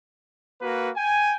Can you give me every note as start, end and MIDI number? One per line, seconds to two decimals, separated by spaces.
0.61 0.90 58
0.61 0.90 66
0.61 0.90 71
0.96 1.37 79
0.96 1.37 80